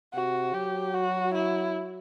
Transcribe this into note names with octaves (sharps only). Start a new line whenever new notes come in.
C3 F#4
F#3 G4
F#4
E4